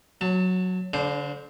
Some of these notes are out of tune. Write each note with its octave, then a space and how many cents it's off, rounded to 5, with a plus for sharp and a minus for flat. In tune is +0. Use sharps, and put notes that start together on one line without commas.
F#3 -5 A5 +25
D3 -35 D4 +10 C5 +0